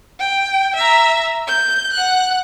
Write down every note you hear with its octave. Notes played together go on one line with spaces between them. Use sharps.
G5
E5 A#5
G6
F#5 F#6